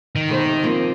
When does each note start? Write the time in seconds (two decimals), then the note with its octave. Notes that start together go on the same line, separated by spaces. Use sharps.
0.16 D#3
0.29 B2 A3 C5
0.45 C3
0.63 F3 A#3 C4